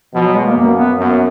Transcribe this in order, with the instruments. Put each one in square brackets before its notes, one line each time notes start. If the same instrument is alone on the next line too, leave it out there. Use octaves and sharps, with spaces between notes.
[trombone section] B2 [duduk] F3
[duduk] F#3
G#3
A#3
[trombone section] F#2 [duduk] A#3
[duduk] B3
[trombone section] F#2